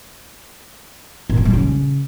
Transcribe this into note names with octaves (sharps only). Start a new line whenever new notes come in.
A#2
F3
G3
C#3